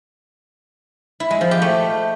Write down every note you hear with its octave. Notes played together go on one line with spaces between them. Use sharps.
E4
G#3
F3
G4
A3